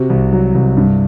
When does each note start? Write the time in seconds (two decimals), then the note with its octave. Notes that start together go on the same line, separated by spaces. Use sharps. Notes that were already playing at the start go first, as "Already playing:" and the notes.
Already playing: C3 F#4
0.10 C2
0.33 F#3
0.55 C2
0.77 G2